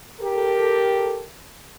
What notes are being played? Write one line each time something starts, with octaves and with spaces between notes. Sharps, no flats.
G4 A4 A#4